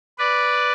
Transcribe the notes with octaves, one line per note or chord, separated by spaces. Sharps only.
B4 D5